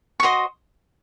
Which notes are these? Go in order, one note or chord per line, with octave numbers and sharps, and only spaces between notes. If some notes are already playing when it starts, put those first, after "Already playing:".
C#6
F#4 C5 D#5 D#6